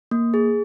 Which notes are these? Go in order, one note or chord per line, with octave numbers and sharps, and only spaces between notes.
A#3
G#4